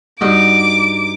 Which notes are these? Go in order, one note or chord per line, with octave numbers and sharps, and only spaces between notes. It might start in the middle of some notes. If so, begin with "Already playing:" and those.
G2 D#4 F#4 D6